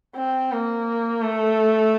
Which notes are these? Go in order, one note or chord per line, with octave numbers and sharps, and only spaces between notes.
C4
A#3
A3